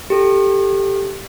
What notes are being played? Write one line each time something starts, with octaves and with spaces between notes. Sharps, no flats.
G4 A4